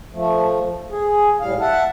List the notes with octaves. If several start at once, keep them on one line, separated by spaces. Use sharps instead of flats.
F3 A3
G#4
A2 G3 F5
E5 F#5 A5